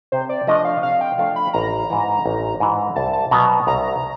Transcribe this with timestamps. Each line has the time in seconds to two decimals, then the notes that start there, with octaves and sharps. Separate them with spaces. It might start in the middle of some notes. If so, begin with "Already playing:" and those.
0.12 C3 C5
0.29 D5
0.47 F3 A3 D4 D#5
0.65 F5
0.83 C3 F5
1.01 G5
1.18 F3 A3 D4 F5
1.36 B5
1.53 A1 A#5
1.90 G#2 E3
2.26 A1
2.60 G#2 E3
2.96 C2 A5
3.13 A5
3.31 B2 F#3 B3 A#5
3.67 C2 A#5